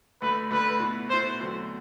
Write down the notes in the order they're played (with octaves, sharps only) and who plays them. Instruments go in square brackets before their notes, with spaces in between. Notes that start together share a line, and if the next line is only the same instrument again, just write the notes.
[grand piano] D2 D3 A3 [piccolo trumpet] B4
[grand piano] D2 D3 A3 [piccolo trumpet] B4
[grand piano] B2 A3 E4 B4
[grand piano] B2 A3 E4 B4 [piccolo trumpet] C5
[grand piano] E2 D3 F#3 A3 C4